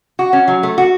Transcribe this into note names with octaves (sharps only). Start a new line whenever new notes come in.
F#4
C#4
F#3
A3
F#4